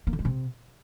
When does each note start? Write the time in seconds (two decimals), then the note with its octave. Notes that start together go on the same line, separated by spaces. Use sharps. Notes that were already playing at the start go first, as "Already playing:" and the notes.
0.07 A#3
0.13 D3
0.19 G#3
0.25 C3